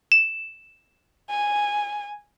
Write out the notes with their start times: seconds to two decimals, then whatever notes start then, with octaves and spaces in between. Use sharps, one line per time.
0.12 E7
1.29 G#5